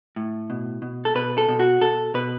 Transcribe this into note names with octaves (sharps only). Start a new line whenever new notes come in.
A2
B2
B2
A4
B2 B4
A4
B2
F#4
B2 A4
B2 B4